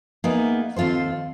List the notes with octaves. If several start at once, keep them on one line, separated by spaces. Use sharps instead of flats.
A#3 B3 D#4 E4 G#4
D#2 C4 F4 A4 C5